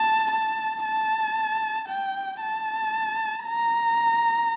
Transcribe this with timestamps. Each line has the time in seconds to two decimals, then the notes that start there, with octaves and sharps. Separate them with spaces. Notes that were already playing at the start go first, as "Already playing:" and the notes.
Already playing: A5
0.32 A5
0.85 A5
1.89 G5
2.41 A5
3.46 A#5